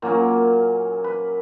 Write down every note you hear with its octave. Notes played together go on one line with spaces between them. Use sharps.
A#2 F#3 A#3 C#4
B4